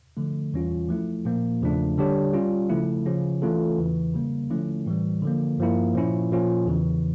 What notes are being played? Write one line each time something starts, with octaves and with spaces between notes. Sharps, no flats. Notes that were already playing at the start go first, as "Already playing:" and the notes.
D3 F3 A3
E2 E3 G3 C#4 F4
F3 A3 E4
A#2 F3 A#3
E2 C#3 F3 A3 D4
D3 G3 D4 G4 C#5
G3 C#4 F4
C#3 F3 A3 E4
C#3 F3 C#4
E3 A3 C#4 F4 A4
E2 C#3 E3
C#3 G3 A#3
D3 F3 A3 C#4 E4
A2 E3 G3
D3 F3 A#3
G2 F3 A#3 E4
A#2 F3 C#4 E4
A#2 F3 C#4 F4
E2 C#3 E3